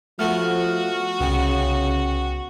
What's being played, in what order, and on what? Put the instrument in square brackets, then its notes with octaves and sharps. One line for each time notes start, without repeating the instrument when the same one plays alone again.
[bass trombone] F3 [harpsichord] A3 B3 [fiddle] F#4 [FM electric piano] F6
[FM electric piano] C2 G5 C#7 [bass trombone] C#3 [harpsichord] B3